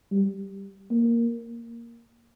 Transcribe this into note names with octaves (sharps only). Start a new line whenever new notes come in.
G3
A#3